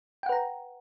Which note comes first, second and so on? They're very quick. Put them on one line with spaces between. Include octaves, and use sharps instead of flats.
G5 F#5 B4 A#5